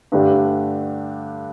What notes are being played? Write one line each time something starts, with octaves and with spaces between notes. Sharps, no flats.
G2 D3 A3 D4 G4